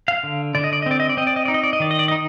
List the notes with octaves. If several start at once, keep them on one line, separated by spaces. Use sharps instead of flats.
F5
D3
D3 D5
D#5
D5
D#5
C4 D5
D#5
D5
C4 D#5
D5
D#5
D#4 D5
D#5
D5
D#5
D#3 D5
D#5
D5
D#4 D#5